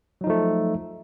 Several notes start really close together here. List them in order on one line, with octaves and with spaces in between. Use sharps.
F#3 D#4 F3 A3